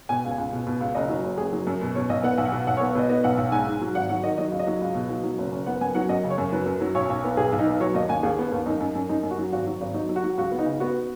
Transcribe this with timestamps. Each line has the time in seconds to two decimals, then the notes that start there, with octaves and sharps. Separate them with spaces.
0.09 B2 G#5
0.24 C#2
0.31 G#5
0.38 C#2
0.53 B2
0.67 B2
0.80 C#2
0.95 F#1 D#5
1.09 F#3
1.24 F#1
1.38 F#1 G#4
1.52 F#3
1.67 F#2
1.81 B2
1.95 B2 C#5
2.10 B1 D#5
2.23 B3 F#5
2.38 B1
2.45 F#5
2.52 B2
2.67 B1 F#5
2.77 C#5
2.80 B3
2.95 B2 D#5
3.09 B3 D#5
3.24 B1 F#5
3.37 B1 F#5
3.52 G#2 G#5
3.67 G#2
3.81 F#3
3.95 G#1 F#5
4.09 F#3 F#5
4.23 D#3 D#5
4.38 F#3 D#5
4.52 C#2
4.59 D#5
4.67 F#3
4.81 C#2
4.95 B2
5.10 F#3
5.24 F#3
5.38 F#1
5.52 F#1
5.66 B3 F#5
5.81 F#2 G#5
5.95 F#3 F#5
6.09 F#2 D#5
6.24 C#3
6.30 C#5
6.38 F#2
6.52 F#3 B4
6.66 F#2
6.81 F#3
6.95 B1 C#5
7.10 B1
7.24 B3
7.37 B1 G#4
7.52 B1
7.59 D#4
7.67 B3
7.81 F#3 C#5
7.94 D#2 D#5
8.09 D#2 G#5
8.23 D#2 G#4
8.38 B3
8.52 D#2
8.66 F#2 D#4
8.81 F#2
8.95 F#2
9.09 F#2 D#4
9.23 F#2
9.31 F#4
9.38 F#3
9.52 G#1 F#4
9.67 F#3
9.81 G#1
9.94 F#3 D#4
10.09 F#3
10.16 F#4
10.24 F#3
10.37 C#2 F#4
10.51 B3
10.59 D#4
10.66 C#3
10.80 B3 F#4